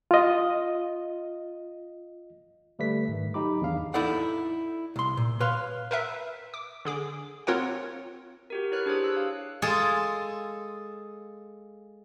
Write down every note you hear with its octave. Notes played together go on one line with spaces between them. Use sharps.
F4 D#5
D3 G3 A3 B4 B6
G#2 D#3
F#3 D#4 G4 B5 D6
E2 D#3 D4 F5
D#4 E4 A4 D5 F#5
C2 C6
A#2
B4 C#5 F5 C6
A#4 B4 E5
D6
D3 G#4 D6
C4 F4 A#4 C#5 F#5
F#4 G4 A#4
E4 A#4 B4 C#5 F6 F#6
D4 G4 G#4 C5 C#5
E6 F#6
F5
G#3 F4 G#4 A4